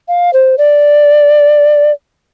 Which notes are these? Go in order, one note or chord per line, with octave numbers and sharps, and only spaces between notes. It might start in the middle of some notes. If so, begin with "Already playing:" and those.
F5
C5
D5